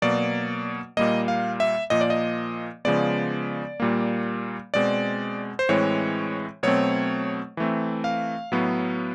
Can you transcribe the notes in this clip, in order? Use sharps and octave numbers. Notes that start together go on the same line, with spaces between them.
B2 F#3 A#3 D5
A#2 G3 A#3 D#5
F5
E5
A#2 F3 A#3 D#5
D5
D#5
C#3 F3 G#3 B3 D5
A#2 G3 A#3
B2 G#3 C4 D5
C5
A2 E3 G#3 C4 C#5
B2 F#3 A3 C4 C#5
E3 A3 C4
F5
A2 F#3 B3